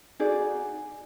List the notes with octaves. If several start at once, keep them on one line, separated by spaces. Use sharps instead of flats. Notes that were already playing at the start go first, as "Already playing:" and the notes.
D#4 F#4 G#4 D5